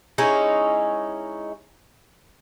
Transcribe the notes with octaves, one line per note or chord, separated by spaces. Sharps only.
G#3 C#4 D#4 E4